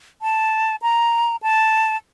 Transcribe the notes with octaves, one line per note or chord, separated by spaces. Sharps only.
A5
A#5
A5